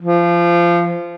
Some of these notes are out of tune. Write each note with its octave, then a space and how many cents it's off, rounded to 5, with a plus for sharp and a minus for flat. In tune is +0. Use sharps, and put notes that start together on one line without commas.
F3 -20